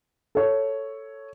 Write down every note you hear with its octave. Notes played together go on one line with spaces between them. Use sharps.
A4 C#5